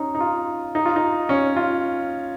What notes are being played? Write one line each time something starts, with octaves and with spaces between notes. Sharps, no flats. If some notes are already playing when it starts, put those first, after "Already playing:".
Already playing: C#4 D#4
D#4
F4
D#4
F4
D#4
C#4
F4